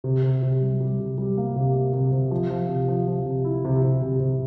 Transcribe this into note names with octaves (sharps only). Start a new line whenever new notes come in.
C3
C3
C3
G3
G3
C3
G3
A#3
C3
A#3
C3
C3
F3
F3
C3
F3
F3
C3
E4
C3
C3
C3
C3